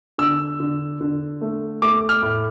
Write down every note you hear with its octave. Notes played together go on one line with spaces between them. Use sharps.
D3 E6
D3
D3
A3
A3 D6
F6
A2